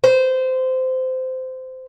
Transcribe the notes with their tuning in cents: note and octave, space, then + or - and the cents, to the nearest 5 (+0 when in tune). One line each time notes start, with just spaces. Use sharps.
C5 -20